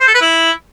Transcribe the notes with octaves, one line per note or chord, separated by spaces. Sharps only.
C5
A4
B4
E4